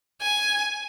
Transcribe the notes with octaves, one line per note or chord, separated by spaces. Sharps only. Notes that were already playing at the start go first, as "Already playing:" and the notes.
G#5